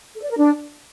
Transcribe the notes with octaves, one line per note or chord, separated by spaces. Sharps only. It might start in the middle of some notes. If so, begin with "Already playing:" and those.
A4
D5
A#4
D4